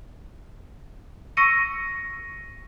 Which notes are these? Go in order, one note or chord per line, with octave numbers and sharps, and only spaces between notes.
C#6 E6 A#6 C#7 D#7